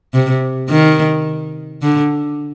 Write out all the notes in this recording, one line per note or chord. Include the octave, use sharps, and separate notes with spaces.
C3
D#3
D3